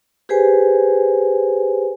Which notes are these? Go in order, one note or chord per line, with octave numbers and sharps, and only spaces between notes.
G4 G#4 B4 C5 G#5